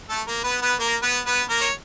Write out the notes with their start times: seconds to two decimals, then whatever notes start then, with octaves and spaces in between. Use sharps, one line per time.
0.10 A3 A4
0.27 A#3 A#4
0.44 B3 B4
0.62 B3 B4
0.79 A#3 A#4
1.02 B3 B4
1.26 B3 B4
1.49 A#3 A#4
1.61 C#5